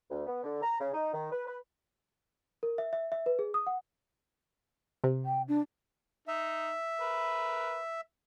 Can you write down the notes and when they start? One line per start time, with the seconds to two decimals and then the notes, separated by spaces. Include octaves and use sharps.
0.10 D2
0.27 B3
0.44 D3
0.62 A#5
0.80 C#3
0.94 D#4
1.13 D#3
1.32 B4
1.47 B4
2.63 A#4
2.78 E5
2.93 E5
3.12 E5
3.26 B4
3.39 G#4
3.54 D#6
3.67 F#5
5.04 C3
5.25 G5
5.48 D4
6.28 D#4 E5
7.01 A#4 B4